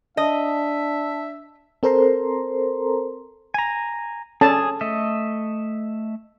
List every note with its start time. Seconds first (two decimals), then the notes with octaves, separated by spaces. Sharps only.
0.17 D4 D#5 E5 A5
1.83 C4 A4 A#4 C5 A#5 C6
3.54 G#5 A#5
4.41 C#4 G#4 A4 A5
4.81 A3 D#5 E5